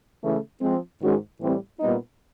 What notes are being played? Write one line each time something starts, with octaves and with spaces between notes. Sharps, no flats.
C#3 E3 A3
F3 G#3 C4
G#2 D#3 G#3 C#4 F#4
A2 E3 G3 C4
A#2 G3 B3 D#4